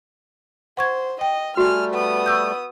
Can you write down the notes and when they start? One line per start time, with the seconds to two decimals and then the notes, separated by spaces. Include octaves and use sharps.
0.77 C5 F#5 C#6 G#6
1.21 D#5 G5
1.57 G3 A3 F#4 G#5 F6
1.91 B3 D#6
2.26 C#6 E6 G6